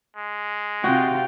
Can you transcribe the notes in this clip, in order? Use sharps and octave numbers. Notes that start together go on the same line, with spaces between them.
G#3
C3 F4 F#4 G5